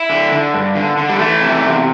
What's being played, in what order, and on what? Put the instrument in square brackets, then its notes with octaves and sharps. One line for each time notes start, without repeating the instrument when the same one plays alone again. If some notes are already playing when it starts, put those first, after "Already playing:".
Already playing: [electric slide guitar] E4
D3
D3
G2
D3
D3
G3
E3 A3
C3
E2